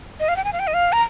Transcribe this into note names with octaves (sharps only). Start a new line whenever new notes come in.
D#5
F5
G5
G#5
F5
G5
D#5
F5
A#5